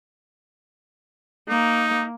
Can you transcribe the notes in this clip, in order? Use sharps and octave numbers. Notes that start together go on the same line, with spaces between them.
A#3 D#4